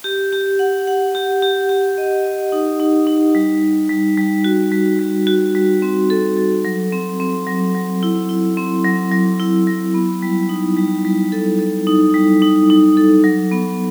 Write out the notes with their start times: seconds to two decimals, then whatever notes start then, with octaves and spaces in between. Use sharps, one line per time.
0.04 G4
0.33 G4
0.59 F#5
0.87 F#5
1.15 G4
1.42 G4
1.69 G4
1.98 D#5
2.24 D#5
2.52 D#4
2.80 D#4
3.07 D#4
3.35 G3
3.62 G3
3.89 G3
4.18 G3
4.44 F#4
4.72 G3
5.00 G3
5.27 F#4
5.55 G3
5.82 C4
6.10 A4
6.37 A4
6.65 F#3
6.92 C4
7.20 C4
7.47 F#3
7.75 F#3
8.03 E4
8.29 E4
8.57 C4
8.85 F#3
9.12 F#3
9.39 E4
9.67 F#3
9.94 B3
10.23 G3
10.49 D#4
10.76 G3
11.05 G3
11.32 A4
11.59 A4
11.87 D#4
12.14 G3
12.42 D#4
12.70 D#4
12.97 A4
13.24 F#3
13.51 B3